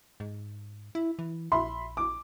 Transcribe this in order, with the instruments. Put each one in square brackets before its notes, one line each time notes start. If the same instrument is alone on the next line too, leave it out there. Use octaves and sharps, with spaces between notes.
[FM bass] G#2
E4
E3
[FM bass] A#1 [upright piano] E5 B5 C6
[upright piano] D6